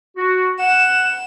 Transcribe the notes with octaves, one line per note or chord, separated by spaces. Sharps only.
F#4
F#5 E7